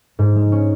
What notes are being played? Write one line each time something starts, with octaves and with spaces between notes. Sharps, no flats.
G#2
G#3
C#4